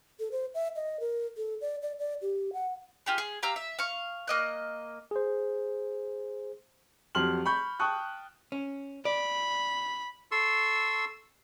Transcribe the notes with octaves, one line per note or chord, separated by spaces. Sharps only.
A4
C5
E5
D#5
A#4
A4
D5
D5
D5
G4
F#5
F4 G4 G#4
G#4
G4 F5 A#5 E6
E5
F5 C#6
A#3 D#5 F#6
G#4 C5
F2 F#3 G4 C6 F6 F#7
B5 C#6 G6
G5 A5 C#6 D#6 F#6
C#4
D5 B5
A4 C6 C#6 E6